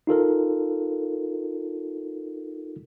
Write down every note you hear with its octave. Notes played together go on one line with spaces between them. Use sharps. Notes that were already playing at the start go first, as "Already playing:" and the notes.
D#4 F4 A4 A#4